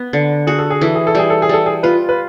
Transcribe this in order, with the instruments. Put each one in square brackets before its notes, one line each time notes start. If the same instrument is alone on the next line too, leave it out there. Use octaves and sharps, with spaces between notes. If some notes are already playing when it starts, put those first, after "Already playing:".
Already playing: [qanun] B3
D3
[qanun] F#4 [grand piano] G#4
[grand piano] A4
G#4
[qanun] E3 [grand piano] A4
[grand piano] G#4
A4
[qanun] G3 [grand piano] G#4
[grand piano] A4
G#4
[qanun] G3 [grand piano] A4
[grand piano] G#4
[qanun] F4 [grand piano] B4
[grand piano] B4